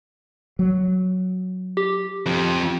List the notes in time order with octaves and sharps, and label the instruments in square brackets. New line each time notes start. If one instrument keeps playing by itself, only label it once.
[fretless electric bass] F#3
[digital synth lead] G4
[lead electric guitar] F2